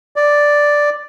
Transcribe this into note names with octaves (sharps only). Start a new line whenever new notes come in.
D5